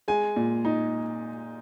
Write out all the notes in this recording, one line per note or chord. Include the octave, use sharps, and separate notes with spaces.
G#3 G#5
A#2
D#4